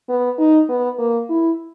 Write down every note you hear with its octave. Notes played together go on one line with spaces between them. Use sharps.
B3
D#4
B3
A#3
E4